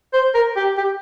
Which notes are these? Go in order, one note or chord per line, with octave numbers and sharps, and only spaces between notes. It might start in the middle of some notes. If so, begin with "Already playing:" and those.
C5
A#4
G4
G4